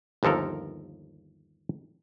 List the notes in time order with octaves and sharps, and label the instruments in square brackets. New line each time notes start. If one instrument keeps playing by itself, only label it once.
[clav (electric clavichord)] G1 D#2 F3 A4 A#4